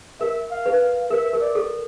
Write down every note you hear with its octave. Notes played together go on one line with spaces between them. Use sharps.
A#4 E5
F5
B4
F5
A#4 E5
A#4
D5
A4